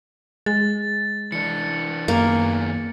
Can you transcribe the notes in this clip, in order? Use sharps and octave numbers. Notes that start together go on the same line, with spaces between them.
G#3 A6
E3 D4 C#7
F#2 D#3 A#3 B3 G#4